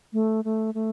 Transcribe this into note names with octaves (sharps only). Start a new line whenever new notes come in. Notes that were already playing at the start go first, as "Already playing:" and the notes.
A3
A3
A3